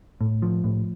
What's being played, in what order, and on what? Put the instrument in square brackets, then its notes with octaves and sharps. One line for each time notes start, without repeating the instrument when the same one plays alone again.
[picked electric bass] A2
F3
A2